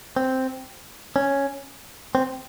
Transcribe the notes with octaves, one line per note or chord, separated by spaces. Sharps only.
C4
C#4
C4